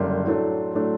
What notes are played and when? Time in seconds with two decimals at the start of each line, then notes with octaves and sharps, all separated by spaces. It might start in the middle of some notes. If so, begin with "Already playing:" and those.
Already playing: F#1 F#2 D3 G3 C6
0.25 A2 F#3 A3 D4
0.73 A2 F#3 A3 D4